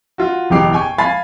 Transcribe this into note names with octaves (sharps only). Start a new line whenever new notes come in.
F4 F#4
F#1 E2 B2 G4 D6 C7
G5 G#5 C#6
F5 G#5 B5 A6 C7